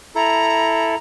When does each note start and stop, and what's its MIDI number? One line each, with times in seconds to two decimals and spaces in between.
0.15 0.95 64
0.15 0.95 69
0.15 0.97 82